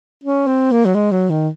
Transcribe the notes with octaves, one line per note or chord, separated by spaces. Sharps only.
C#4
C4
A#3
F#3
G#3
F#3
D#3